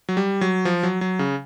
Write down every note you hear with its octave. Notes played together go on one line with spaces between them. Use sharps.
F#3
G3
F#3
F3
F#3
F#3
C#3